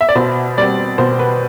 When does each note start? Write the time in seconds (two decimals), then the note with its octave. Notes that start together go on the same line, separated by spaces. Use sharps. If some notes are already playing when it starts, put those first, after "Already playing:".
0.01 E5
0.09 D5
0.15 B2 C5
0.58 G3 C4 D5
0.98 B2 C5
1.19 B4